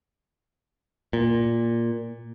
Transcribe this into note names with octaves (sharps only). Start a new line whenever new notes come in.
A#2